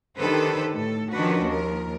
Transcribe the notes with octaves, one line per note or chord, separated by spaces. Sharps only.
D3 D#3 G4 A4 B4 C5
A2 A4
D#3 F3 C#4 D4 F#4 B4
D#2 F3 A#4